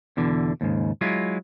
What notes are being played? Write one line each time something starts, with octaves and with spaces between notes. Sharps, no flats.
E2 B2 D3 E3
D#2 G#2 C#3
F#3 G#3 E4 F4